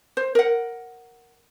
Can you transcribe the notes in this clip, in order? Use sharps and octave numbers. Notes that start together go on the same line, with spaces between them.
C5
A#4 F#5